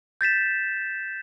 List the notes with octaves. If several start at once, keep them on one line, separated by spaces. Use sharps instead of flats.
G6 A6 B6 E7